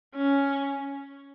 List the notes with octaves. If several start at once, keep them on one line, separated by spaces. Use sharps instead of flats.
C#4